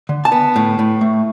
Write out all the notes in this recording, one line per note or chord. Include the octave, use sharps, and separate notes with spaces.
D3
A5
B3
A2
A2
A3